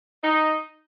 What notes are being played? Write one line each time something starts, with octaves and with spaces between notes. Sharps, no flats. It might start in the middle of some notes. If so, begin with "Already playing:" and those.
D#4